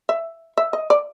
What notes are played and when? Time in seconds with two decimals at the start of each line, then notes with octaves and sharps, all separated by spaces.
0.09 E5
0.57 E5
0.73 D#5
0.90 D5